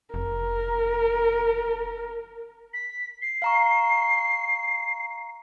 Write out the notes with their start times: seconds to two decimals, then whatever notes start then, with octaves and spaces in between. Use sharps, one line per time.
0.14 F1 A#4
2.74 B6
3.22 C7
3.42 F5 A#5 C#6